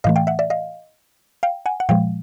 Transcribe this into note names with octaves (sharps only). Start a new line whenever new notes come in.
A2 E3 A3 D#5 F5
F5 G5
E5 F#5
D5 E5
D#5 F5
F5 G5
F#5 G#5
F#5
A#2 F3 G#3 F5 G5